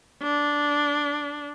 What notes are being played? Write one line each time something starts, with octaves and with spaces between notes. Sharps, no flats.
D4